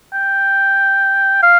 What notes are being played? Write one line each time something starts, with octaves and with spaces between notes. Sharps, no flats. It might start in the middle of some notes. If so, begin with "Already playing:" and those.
G5
F5